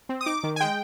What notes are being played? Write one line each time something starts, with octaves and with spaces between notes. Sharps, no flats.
C4
D#6
D#4 D6
D#3
G#5
G#3 G5